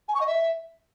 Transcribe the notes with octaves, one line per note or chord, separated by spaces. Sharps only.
G#5
C#6
D#5
E5